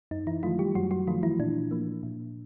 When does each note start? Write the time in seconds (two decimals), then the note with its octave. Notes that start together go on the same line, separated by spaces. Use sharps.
0.11 F#2 D#4
0.27 E3 E4
0.43 D#3 F3 F#3 A3 F4
0.59 G3 G4
0.75 F#2 F#3 F#4
0.91 F#3 F#4
1.07 D#3 F3 F#3 A3 F4
1.23 E3 E4
1.39 A#2 D4
1.71 F3 A#3
2.03 A#2